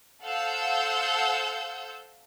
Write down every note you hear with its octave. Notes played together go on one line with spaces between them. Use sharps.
A4 C5 F5 F#5 E6 G6